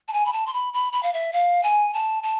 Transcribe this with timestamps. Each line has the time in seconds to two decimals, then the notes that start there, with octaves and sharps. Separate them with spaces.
0.08 A5
0.13 G#5
0.26 B5
0.33 A5
0.47 C6
0.54 B5
0.73 B5
0.93 B5
1.03 F5
1.13 E5
1.33 F5
1.63 G#5
1.94 A5
2.23 A5